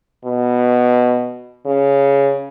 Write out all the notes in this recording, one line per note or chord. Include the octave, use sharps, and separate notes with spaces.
B2
C#3